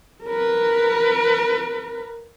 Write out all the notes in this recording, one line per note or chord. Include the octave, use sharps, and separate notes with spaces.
A#4 B4